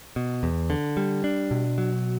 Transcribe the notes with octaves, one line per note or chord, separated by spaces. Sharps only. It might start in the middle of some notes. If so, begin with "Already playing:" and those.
B2
E2
D3
G3
D4
B2
F#3